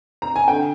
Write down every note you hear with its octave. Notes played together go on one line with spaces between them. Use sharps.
A#5
G#5
D3 G5